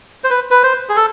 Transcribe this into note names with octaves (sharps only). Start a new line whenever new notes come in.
C5
B4
B4
C5
G#4
A4